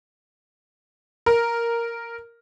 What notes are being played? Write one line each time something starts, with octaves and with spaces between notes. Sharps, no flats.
A#4